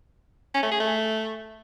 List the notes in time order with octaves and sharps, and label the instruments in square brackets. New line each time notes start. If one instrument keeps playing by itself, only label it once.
[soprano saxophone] C#4
A3
G#4
A3